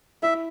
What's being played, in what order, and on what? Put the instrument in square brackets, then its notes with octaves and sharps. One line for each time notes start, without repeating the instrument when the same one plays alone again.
[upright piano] E4 [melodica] E5